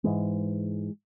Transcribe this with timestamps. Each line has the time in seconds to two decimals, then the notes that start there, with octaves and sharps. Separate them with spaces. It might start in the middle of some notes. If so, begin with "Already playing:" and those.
0.04 G#2 E3 G#3